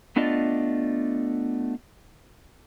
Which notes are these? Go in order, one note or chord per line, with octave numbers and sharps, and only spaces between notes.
A3 B3 D4 F4 D5 D#5